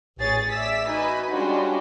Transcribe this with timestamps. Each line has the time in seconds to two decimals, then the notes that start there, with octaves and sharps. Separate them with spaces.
0.19 A1 G#4 C#5 A6
0.52 D5 E5 E6 B6
0.87 D#4 F#4 B4 D#5 G#5 B5
1.32 G3 G#3 C#4 D4 F4 F#4